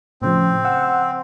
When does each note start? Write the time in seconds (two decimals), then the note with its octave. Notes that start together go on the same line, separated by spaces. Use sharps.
0.22 A2 C#3 F3 C4
0.65 F#5 E6